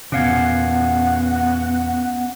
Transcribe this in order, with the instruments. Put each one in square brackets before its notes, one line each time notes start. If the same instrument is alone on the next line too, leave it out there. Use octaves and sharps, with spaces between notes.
[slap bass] E2 A#2 [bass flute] B3 [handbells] C#4 F5 G#6 [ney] F#5